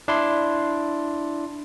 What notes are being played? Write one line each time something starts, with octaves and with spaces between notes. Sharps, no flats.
D4 E4 C6